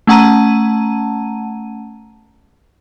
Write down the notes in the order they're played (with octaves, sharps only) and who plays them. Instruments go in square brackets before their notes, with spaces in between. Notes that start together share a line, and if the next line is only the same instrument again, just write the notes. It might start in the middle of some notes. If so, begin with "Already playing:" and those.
[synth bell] A3 C#4 F#5 A5 A#5 D#7